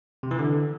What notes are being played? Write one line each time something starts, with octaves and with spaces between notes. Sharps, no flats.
C3
E3
D3